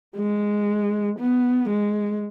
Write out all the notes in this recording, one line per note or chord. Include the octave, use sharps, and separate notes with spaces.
G#3
B3
G#3